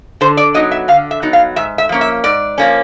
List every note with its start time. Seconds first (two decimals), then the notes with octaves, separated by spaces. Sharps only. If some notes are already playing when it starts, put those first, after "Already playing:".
0.21 D3 C5
0.37 D5
0.54 F#3 B3 D#4 D#5
0.71 E5
0.88 D3 F5
1.11 E5
1.22 F#3 B3 D#4
1.33 F5
1.56 G#2 E5
1.78 E5
1.89 F3 A#3 C#4
2.01 E5
2.24 G#2 D5
2.58 F3 A#3 C#4